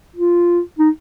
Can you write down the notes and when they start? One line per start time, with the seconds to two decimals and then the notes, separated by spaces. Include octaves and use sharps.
0.16 F4
0.79 D#4